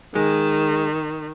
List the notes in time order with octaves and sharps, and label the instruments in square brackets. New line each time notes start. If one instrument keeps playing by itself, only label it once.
[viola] D#3 [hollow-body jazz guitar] G#3